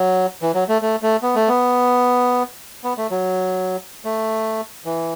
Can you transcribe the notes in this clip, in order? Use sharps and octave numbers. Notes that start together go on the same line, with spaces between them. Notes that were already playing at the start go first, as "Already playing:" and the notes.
Already playing: F#3
E3
F#3
A3
A3
A3
B3
A3
B3
B3
A3
F#3
A3
E3